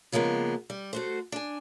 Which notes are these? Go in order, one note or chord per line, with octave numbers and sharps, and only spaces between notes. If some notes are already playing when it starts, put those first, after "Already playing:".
C#3 F3 G#3 A#3 B3
G3
A3 F#4 C5
D4 G#5